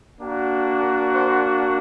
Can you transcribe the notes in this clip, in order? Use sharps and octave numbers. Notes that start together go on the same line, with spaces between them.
A#3 D4 F#4
C5